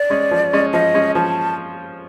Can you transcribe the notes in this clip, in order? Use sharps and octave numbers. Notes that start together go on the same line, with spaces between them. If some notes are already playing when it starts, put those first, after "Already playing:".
Already playing: D5
G#3 C#4
F3
G#3 C#4
F3 D#5
G#3 C#4
F3 A5